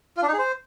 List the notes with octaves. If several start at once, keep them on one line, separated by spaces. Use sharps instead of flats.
F4
D4
D#4
G#4
C5